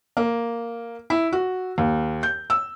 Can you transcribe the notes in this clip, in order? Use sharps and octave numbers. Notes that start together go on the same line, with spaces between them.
A#3
E4
F#4
D#2
G6
E6